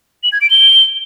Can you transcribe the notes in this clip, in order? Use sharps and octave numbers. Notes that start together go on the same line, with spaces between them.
F#7
G#6
D7
G7